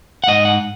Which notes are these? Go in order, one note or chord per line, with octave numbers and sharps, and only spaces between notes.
F#5
G#2 D#5
F#5